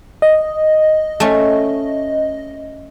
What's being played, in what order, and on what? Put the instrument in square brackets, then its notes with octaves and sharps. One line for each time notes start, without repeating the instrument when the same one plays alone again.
[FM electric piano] D#5
[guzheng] A3 C#4